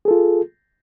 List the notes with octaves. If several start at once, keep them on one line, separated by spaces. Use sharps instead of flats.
F4 G#4 A4